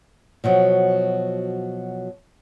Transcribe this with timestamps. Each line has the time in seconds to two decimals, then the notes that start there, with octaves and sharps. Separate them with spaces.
0.44 B2 F3 F#3